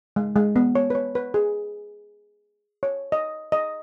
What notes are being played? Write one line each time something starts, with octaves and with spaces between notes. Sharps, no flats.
G#3
G#3
B3
C#5
B4
C#5
B4
G#4
C#5
D#5
D#5